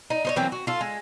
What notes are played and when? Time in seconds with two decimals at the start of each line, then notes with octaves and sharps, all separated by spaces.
0.10 D#4
0.25 D#4 C5 C#5
0.36 E3 F#3 A#3 C4
0.52 F#4
0.67 F4 A4
0.81 G#3